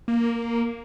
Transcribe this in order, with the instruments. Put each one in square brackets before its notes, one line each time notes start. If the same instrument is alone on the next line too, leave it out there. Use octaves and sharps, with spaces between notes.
[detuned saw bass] A#3